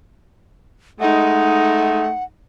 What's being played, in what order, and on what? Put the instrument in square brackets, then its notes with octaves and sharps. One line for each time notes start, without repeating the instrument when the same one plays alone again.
[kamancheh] G#3 D#4 [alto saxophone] A3 [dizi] F#5